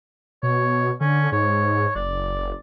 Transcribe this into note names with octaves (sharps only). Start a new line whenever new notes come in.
B2 C#5
D3 C#4
G#2 C#5
F#1 D5